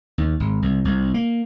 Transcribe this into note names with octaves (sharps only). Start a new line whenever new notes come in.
D#2
G#1
C2
C2
A#3